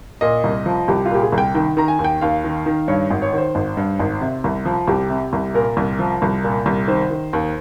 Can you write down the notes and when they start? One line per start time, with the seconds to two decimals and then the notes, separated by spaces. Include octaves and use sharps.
0.21 A#2 D#5
0.44 C2
0.66 F3
0.88 C2 G4
1.06 F4
1.11 A#2 G4
1.22 G#4
1.32 C2
1.38 G5
1.54 D#3 G5
1.77 D#3 A#5
1.88 G#5
1.99 D#2
2.04 G5
2.21 D#2 F5
2.44 D#3
2.66 D#3
2.88 G2 C#5
3.10 G#1
3.22 C#5
3.33 D#3 C5
3.55 G#1
3.77 G2
3.99 G#1
4.21 C3
4.44 C2
4.65 F3
4.88 C2 G4
5.10 C3
5.33 C2
5.54 A#2 A#4
5.77 C2
5.99 F3
6.22 C2
6.44 A#2
6.66 C2
6.88 D#3 C5
7.10 D#3
7.33 D#2